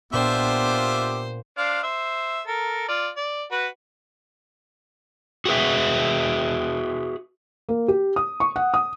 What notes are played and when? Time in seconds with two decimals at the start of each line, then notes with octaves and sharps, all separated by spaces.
0.13 A#2 B3 D4 F4 G4 C5 E5 G5
1.58 D4 C5 F5
1.83 C5 E5
2.47 A4 A#4
2.88 F4 D5
3.17 D5
3.52 F#4 B4
5.46 F#4 G#4 B4 E5
7.69 A#3
7.88 G4
8.16 D#6
8.40 C#6
8.56 F#5
8.74 D#6